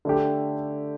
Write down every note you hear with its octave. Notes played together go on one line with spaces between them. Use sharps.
D3 A3 G4